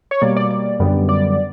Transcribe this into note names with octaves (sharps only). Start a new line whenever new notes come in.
C#5
B2 G3 A#3 D5
D5
D5
F#2 D3 G3 B3
D5